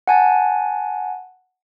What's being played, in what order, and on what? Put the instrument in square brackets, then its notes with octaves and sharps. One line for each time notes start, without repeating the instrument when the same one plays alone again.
[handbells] F#5 G#5 A5